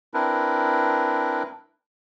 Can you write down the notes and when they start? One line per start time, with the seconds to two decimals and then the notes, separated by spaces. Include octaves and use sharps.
0.14 C4 D4 E4 A#4 B4